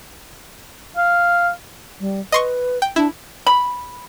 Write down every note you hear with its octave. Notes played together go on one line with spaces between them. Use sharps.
F5
G3
B4 D#5 C6 C#6
G5
D4 E4
B5